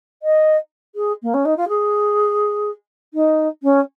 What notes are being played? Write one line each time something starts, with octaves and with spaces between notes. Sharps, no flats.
D#5
G#4
A#3
C#4
D#4
F4
G#4
D#4
C#4